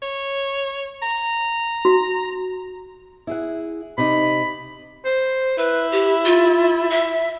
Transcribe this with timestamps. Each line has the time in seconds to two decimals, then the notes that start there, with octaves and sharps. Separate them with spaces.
0.02 C#5
1.02 A#5
1.85 F#4
3.27 E4 G#4 F#5
3.98 C3 D#4 B5
5.05 C5
5.58 E4 B4
5.92 G4
6.25 F4
6.90 E5